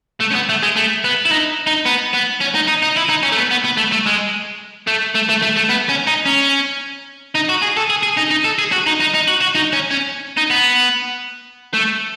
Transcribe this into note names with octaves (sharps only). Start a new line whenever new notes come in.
A3
C#4
B3
A3
G#3
A3
B3
E4
D#4
D#4
B3
B3
C#4
D#4
D#4
D#4
E4
D#4
C#4
A3
B3
B3
B3
A3
A3
G#3
A3
A3
A3
A3
A3
B3
C#4
D#4
C#4
D#4
F#4
G#4
A4
G#4
G#4
D#4
D#4
A4
G#4
F#4
D#4
D#4
D#4
F#4
F#4
D#4
C#4
C#4
D#4
B3
A3